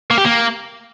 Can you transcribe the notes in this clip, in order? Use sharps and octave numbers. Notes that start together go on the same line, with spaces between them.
A#3
G4
A#3